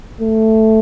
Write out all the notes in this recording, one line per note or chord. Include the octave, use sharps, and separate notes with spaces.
A3